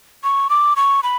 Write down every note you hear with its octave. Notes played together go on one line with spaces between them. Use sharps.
C#6
D6
C#6
B5